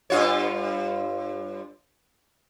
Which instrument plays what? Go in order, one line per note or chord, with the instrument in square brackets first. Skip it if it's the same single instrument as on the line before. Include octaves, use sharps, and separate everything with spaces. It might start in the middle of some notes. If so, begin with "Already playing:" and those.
[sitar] G2 F4 C#5